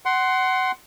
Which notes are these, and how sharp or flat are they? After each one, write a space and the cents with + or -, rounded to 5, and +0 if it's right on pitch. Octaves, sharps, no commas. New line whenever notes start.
F#5 +20 C6 +0